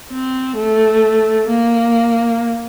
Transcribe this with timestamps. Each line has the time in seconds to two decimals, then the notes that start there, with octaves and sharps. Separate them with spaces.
0.11 C4
0.57 A3
1.49 A#3